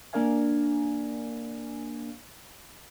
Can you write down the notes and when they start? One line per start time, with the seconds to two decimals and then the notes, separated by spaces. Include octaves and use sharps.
0.13 A#3 D4 A#4 D5 F5 G#5